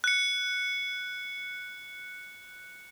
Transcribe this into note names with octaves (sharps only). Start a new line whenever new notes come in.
F#6 C#7